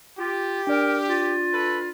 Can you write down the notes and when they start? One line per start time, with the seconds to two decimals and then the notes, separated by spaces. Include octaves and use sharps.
0.17 F4 G4
0.67 D4 A#4 D5
1.07 F4
1.52 A4 B4